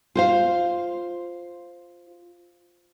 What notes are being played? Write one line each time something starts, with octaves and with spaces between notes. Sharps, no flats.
F4 C5 F5